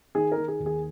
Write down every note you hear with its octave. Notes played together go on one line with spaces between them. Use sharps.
D#3 G#4
A#4
D#3
G#4
D#2
G#4